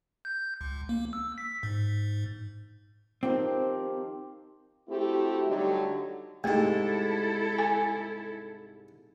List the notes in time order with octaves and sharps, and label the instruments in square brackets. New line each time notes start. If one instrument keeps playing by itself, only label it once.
[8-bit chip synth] G6
C#2
A#3
E6
B6
G#2
[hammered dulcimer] D#3 F3 G4 [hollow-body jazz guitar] C4
[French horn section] A3 C4 E4 F#4 G4
D3 F#3 G3 A3 D#4 G4
[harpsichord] C2 G#2 [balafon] A3 [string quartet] E4 A4
[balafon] G#5